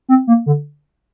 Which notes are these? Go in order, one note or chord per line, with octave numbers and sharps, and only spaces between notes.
C4
A#3
D3